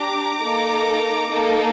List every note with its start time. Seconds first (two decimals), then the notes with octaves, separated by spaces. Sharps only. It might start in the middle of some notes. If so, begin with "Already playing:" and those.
Already playing: D4 G4 A#5 D6
0.41 A#3 D#4 A4
1.32 A#3 D#4 A4